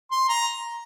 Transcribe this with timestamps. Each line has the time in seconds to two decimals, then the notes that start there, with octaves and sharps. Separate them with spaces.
0.11 C6
0.29 A#5